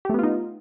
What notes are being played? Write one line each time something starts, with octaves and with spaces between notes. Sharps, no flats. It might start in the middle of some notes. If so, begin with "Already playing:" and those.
A3 B3 D#4 F4 G4